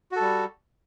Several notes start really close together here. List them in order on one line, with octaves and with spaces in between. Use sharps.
F#4 A4 G3